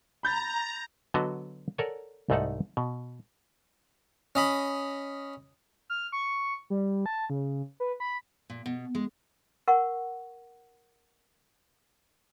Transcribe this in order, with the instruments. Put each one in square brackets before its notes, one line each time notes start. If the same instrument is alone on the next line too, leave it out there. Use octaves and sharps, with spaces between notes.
[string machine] A#5 [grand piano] B5 G6 A6
[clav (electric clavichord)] D3 F#3 B3 F#4 D#5 A5
A4 A#4 C#5 D5 F#5 G#5
C2 G#2 A3 D#4 A4 F#5
B2
[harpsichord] C#4 D#5 B5
[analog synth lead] F6
C#6
G3
A5
C#3
B4
B5
[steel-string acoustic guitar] A#2
B2
G#3
[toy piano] A#4 F#5 C#6